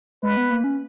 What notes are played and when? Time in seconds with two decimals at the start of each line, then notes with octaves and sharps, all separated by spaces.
0.23 G#3 B4
0.37 B3
0.50 A#3
0.64 C#4